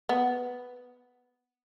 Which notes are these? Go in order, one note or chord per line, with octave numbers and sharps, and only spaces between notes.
B3